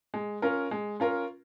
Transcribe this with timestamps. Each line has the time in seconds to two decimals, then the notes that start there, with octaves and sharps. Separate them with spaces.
0.14 G#3
0.42 C#4 F4 A#4
0.71 G#3
1.00 C#4 F4 A#4